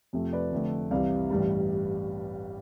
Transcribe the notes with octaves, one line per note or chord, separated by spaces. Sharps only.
F2 C3 F3 A3
B4 D5
F1 F2 D3 A3
C2 C3 E3 G3 D5 F5
A1 G2 E3 G3